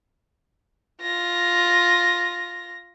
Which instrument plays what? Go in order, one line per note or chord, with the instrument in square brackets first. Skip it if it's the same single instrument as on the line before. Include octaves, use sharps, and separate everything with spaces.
[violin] F4 A#6